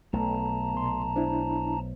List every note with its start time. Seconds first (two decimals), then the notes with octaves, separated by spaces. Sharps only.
0.13 B1 A3 A5 A#5
0.74 B2 C6
1.16 D4 E4 C5